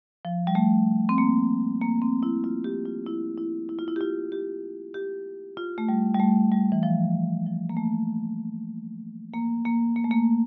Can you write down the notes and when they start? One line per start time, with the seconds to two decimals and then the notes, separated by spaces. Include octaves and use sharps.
0.25 F3
0.47 G3
0.55 A3
1.09 C4
1.18 A#3
1.81 A#3
2.02 C4
2.23 E4
2.44 F4
2.64 G4
2.85 F4
3.06 E4
3.38 E4
3.69 E4
3.79 F4
3.88 E4
3.96 G4
4.01 F4
4.32 G4
4.94 G4
5.57 F4
5.78 A3
5.89 G3
6.14 G3
6.20 A3
6.52 G3
6.72 E3
6.83 F3
7.46 F3
7.69 A#3
7.77 A3
9.34 A#3
9.65 A#3
9.96 A#3
10.04 A3
10.11 A#3